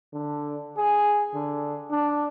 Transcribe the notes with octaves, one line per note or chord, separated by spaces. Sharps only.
D3
G#4
D3
D4